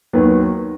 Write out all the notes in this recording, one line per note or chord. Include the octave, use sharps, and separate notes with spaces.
D#2 D#3 F#3 B3